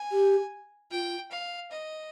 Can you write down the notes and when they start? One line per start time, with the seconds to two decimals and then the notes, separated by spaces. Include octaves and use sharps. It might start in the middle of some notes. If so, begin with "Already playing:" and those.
Already playing: G#5
0.11 G4
0.91 F4 G5
1.31 F5
1.71 D#5